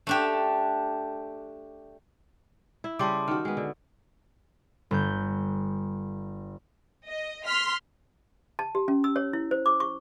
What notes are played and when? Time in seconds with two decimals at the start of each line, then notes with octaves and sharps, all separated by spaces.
0.07 A3 D4 G4
2.84 E4
2.99 C#3 G3 G4 A5 C6 D6
3.28 D#3 F#4 F6
3.45 G#3 B3
3.57 D3
4.91 G1 G6
7.07 D#5
7.45 C6 F6 B6
8.59 A5
8.75 G4
8.88 C#4
9.04 E6
9.16 C#5
9.33 E4
9.51 C5
9.66 D6
9.80 C#6